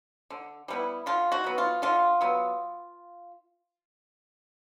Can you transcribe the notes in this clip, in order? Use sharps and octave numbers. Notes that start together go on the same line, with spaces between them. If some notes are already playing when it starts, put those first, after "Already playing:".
D3
G3 B3 E4
D3 F4
F#4
F#3 B3
F4
D3 F4
F#3 B3